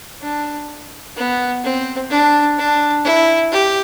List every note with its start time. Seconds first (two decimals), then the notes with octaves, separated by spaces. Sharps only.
0.21 D4
1.16 B3
1.64 C4
2.10 D4
2.58 D4
3.04 E4
3.52 G4